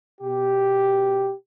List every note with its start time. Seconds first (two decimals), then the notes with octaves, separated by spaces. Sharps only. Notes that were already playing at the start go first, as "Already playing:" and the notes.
0.21 B2 G4